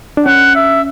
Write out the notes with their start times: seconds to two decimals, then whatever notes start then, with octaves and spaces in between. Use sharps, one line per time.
0.17 D4
0.26 C#4 F#5
0.55 E5